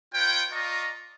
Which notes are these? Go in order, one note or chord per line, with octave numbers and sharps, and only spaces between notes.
F4 B4 C#5 G5
F4 D5 D#5 A5 A#5 C#6